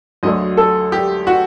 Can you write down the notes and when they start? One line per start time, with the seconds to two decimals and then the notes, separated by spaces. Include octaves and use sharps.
0.23 D2 D3 F#3 A3 D#5
0.57 A4
0.92 G4
1.27 F#4